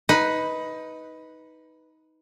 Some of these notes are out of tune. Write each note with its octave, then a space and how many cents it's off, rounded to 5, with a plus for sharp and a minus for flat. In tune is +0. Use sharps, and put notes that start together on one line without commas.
D#4 +20 B4 +0